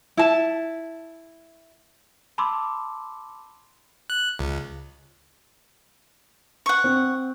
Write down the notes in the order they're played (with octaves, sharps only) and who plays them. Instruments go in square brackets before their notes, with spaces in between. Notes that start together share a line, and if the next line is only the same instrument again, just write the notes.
[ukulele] E4 A5
[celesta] A5 B5 C6 D6 E6
[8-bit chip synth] F#6
C#2
[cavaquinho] F#5 C#6
[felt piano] C4